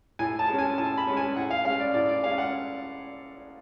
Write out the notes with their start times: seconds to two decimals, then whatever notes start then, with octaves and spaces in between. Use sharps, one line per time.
0.19 A2 G#5
0.39 A5
0.48 G#3 C#4
0.59 G#5
0.78 A2 A5
0.98 B5
1.07 G#3 C#4
1.17 G#5
1.36 A2 F#5
1.51 F5
1.65 G#3 C#4 F5
1.80 D5
1.94 A2 D5
2.09 D5
2.23 G#3 F5
2.27 C#4
2.38 F#5